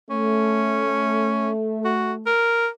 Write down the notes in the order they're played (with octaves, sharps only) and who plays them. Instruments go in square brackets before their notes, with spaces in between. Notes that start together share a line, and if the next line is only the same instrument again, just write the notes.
[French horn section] A3 [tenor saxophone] C#4
[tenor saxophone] F#4
A#4